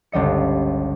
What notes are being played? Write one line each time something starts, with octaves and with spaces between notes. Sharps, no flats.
G1 C#2 G3 D#5 C#7